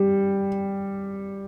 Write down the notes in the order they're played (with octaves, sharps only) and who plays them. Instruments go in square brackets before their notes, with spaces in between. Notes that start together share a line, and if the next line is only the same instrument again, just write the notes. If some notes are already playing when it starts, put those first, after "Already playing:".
Already playing: [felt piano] G3